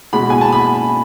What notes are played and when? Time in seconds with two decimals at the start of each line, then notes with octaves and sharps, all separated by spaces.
0.13 B2 G#3 B5
0.30 G#5
0.41 A5
0.52 B5